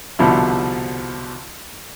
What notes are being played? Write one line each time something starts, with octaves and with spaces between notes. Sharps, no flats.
C2 B2 D3 F3 E4